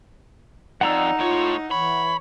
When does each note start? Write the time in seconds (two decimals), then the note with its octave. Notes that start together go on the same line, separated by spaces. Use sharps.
0.81 F2 D#4 D5 F#5 A#5 E6
1.19 A2 F4 C#5
1.71 E3 C#5 B5